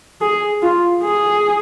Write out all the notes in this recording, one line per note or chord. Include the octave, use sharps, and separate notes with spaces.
G#4
F4
G#4